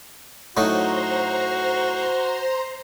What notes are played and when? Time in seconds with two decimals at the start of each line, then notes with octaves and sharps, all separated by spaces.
0.57 A2 F#3 D#4 F#4 C5 A#5 C6